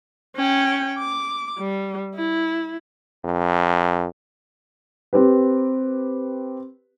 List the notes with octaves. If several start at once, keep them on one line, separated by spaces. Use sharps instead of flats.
C#4 G5
D6
G3
E4
F2
C4 G4 B4